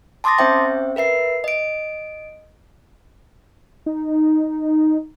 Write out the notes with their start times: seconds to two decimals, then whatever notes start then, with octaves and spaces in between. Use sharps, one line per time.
0.24 A5 C6 D6 D#6 A6 A#6
0.39 C4 C#4 C5 E5 G5
0.96 A#4 B4 E5 C7
1.44 D#5 D7
3.86 D#4